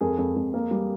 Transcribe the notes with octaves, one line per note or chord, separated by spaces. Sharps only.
F2 G#4 A#4
F2
F2
A#3
G3